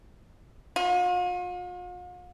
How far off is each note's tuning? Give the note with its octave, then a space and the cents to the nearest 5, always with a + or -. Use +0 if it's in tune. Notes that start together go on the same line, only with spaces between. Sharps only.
F4 +45